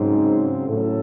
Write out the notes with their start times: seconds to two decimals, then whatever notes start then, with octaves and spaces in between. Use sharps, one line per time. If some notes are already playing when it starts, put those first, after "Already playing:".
Already playing: G#2 C#3 F#3 C4
0.68 A2 F#3 C#4 E4 A4